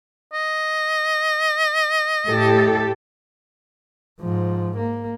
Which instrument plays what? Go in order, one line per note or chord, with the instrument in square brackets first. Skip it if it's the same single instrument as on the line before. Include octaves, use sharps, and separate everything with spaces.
[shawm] D#5
[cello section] A2 G4 A4
[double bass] G#2 F3
A#3